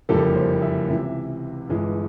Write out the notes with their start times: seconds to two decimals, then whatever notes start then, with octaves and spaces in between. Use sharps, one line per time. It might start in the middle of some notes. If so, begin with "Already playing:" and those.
0.09 F#1 F2 D3 G3 A#3 A4
0.35 C5
0.62 E5
0.89 C#2 C3 E3
1.68 G1 G2 E3 G#3